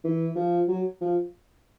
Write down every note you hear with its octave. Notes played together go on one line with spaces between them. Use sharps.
E3
F3
F#3
F3